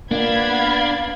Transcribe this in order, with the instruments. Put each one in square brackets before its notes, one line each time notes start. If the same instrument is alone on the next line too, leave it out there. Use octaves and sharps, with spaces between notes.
[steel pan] A#3 [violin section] B3 B5 G#6 [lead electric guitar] D4 [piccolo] F5